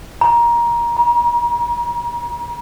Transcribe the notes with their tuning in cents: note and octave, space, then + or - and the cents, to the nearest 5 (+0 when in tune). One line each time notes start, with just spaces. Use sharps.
A#5 +20
A#5 +40